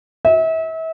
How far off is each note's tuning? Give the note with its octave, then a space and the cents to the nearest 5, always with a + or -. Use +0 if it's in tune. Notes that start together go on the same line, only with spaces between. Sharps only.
E5 -35